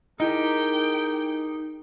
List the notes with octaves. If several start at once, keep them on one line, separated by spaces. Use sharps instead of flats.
D#4 E4 G4 G#4 A#4 D#5 G5